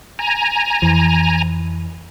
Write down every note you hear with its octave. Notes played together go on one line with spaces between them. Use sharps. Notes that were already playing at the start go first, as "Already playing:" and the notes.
G#5 A#5
F2 E3